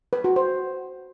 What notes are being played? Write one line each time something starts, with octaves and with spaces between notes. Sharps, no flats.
B4
F#4
C5